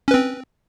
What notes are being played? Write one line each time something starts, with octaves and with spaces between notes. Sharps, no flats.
C4 C#4 B4